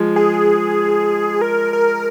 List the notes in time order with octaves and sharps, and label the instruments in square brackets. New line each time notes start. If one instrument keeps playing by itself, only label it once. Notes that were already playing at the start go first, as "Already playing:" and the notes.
Already playing: [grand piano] F3 G#3
[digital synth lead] G#4
A#4
A#4